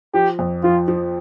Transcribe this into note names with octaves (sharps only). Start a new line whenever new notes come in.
F3 G4
F2
F3 F4
F3